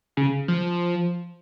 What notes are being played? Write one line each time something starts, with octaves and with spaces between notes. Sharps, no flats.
C#3
F3